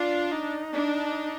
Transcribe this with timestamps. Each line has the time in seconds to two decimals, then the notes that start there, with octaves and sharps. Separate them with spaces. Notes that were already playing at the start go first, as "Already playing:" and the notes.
Already playing: D4 F4
0.31 D#4
0.74 D4